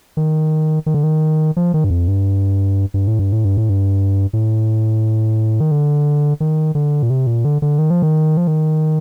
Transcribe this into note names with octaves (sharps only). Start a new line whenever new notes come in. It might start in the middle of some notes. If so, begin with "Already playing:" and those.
D#3
D#3
D3
D#3
F3
D#3
G2
F2
G2
G2
A2
G2
A2
G2
A2
G2
A2
D#3
D3
D#3
D3
A#2
C3
A#2
D3
D3
D#3
F3
D#3
F3
D#3